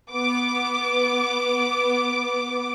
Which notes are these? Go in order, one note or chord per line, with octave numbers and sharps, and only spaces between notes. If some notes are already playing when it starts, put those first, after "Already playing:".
B3 D6